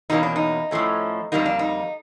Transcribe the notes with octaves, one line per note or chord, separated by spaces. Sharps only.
E2 B2 F#3 A#3 C#4 D#4
D4
D#4
A2 F3 A3 C#4
F2 D3 G3 A#3 D4 D#4
D4
D#4